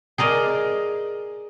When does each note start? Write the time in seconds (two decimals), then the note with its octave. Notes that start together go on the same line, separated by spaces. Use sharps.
0.18 G#4 A#4 D5 D#5